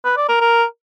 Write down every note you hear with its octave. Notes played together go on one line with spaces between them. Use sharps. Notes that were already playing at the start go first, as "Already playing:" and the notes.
B4
D5
A#4
A#4